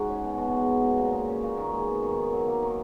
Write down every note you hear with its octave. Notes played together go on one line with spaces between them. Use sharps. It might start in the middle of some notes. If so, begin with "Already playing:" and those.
Already playing: G#2 G#3 F#4
C#4
B2
B2 F#4
G#3
B3
B2
A#2
G#3
C#4
A#2
D#3 F#4
G#3
B3
D#3
D#3
F#3
A#3
D#3